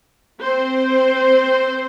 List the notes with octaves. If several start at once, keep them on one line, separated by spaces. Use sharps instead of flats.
C4 C5